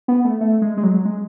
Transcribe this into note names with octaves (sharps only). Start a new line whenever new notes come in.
B3
A3
A3
G#3
G#3
F#3
G#3